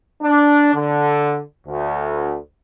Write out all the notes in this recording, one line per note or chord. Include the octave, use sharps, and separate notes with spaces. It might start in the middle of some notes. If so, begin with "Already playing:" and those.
D4
D3
D2